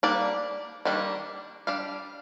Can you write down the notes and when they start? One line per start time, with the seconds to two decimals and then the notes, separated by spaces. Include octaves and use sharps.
0.03 G3 A#3 D4 D5
0.85 D#3 G3 A#3 D4
1.67 G3 D4 F5